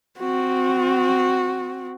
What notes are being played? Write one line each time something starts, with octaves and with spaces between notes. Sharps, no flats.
C4 F#4